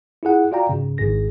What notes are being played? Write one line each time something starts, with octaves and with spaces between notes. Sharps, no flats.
E4 F4 G#4 F#5
F4 F#4 D5 F5 G5 A#5
G#2 C#3
G#1 G#2 G#4 A#6